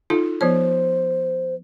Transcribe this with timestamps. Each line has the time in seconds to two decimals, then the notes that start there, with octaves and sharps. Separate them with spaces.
0.10 D#4 F4 A4
0.41 F3 B3 C5 C#5